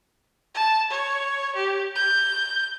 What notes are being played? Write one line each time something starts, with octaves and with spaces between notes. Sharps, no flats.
A5
C#5
G4
G6